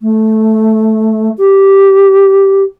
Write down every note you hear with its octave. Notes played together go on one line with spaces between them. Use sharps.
A3
G4